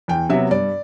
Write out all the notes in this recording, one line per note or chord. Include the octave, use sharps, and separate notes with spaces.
E2 G5
C3 F#3 B3 E5
G2 D5